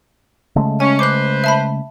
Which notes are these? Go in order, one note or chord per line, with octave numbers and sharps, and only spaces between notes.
C#3 G#3 A3
C#4 G#5
B4 C5 D6 F#6
E5 A5 B5